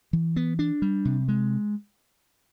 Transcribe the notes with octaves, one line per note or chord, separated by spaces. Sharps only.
E3
B3
D4
G3
C3
G#3